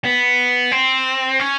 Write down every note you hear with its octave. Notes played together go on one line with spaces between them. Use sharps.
B3
C4
C#4